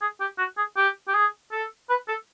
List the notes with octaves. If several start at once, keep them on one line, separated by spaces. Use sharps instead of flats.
G#4
G4
F#4
G#4
G4
G4
G#4
A4
B4
A4